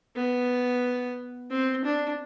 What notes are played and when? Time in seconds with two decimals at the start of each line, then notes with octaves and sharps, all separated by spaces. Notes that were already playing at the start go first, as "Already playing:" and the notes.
0.16 B3
1.51 C4
1.85 D4